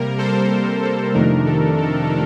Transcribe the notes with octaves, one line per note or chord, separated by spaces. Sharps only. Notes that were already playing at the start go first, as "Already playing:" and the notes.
Already playing: C3 G3 A#3 A#4
A4 C5
A4
F2 C3 D#3 A3 D4 A#4
A4
A4